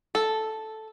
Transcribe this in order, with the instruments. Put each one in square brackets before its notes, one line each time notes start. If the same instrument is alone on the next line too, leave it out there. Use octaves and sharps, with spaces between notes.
[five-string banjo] A4